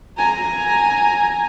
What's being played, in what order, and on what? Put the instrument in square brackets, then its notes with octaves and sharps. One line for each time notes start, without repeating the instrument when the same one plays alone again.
[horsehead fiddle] G#5 A#5